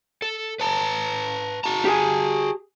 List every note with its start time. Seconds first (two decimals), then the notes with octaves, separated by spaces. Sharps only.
0.22 A4
0.60 B4 A5 A#5
1.64 F#4 A5 A#5
1.85 G4 G#4 G#5